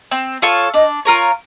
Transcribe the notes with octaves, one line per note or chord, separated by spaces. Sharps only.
C4
F4 A4 C#5
D4 D#5
F4 A#4 C#5